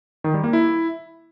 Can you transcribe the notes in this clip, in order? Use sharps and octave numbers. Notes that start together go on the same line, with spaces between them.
D#3
G3
A#3
E4